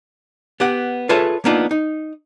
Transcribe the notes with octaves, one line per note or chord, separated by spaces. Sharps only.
B3 G4 F#5
F4 G#4 A4 B4 C#5 E5
A#3 B3 D4 D#4 F4
D#4